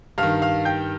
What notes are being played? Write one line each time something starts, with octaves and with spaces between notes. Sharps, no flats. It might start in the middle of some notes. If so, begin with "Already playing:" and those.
G2 D#3 F5 F6
F5 F6
G5 G6